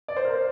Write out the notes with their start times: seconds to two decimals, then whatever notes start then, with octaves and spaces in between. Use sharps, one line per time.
0.08 D5
0.17 C5
0.25 A#4
0.34 C5